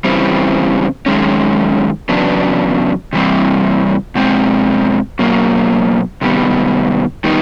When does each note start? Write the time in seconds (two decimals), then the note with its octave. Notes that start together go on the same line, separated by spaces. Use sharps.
0.04 E2 C#3 E3 G3 C4
1.06 F#2 D#3 G#3 C#4
2.09 E2 C#3 F#3 B3 D4
3.13 C3 E3 G3 C4
4.15 B2 G#3 C4
5.19 B2 F#3 A#3
6.21 C3 D#3 G3 B3
7.24 D#3 G3 B3 D#4